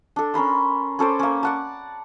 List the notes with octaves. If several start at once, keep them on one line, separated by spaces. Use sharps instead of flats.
D4 A4
C#4 A#4 B5 C6
C#4 A4 C5 D5
A#3 C#4
D5 F#5 A5